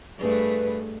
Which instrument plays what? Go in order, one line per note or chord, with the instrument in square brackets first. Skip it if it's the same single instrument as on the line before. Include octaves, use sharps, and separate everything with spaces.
[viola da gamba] G2 A3 G#4 [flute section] B4